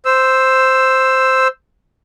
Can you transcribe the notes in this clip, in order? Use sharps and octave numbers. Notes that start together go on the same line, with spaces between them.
C5 E6